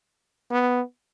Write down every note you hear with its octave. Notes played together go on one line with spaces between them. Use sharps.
B3